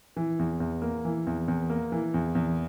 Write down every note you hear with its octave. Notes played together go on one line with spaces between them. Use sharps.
E3
E2
E2
A#3
E3
E2
E2
A#3
E3
E2
E2